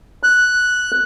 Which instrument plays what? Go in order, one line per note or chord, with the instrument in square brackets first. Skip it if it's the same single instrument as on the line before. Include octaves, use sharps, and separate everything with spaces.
[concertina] F#6